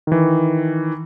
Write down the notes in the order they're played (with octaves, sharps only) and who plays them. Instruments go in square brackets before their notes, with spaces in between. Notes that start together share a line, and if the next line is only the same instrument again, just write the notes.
[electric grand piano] D#3 E3